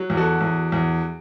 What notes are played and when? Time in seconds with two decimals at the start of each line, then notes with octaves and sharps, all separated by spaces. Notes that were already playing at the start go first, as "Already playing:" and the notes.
Already playing: F#3
0.10 E2
0.17 F#4 A4
0.41 E2
0.72 E2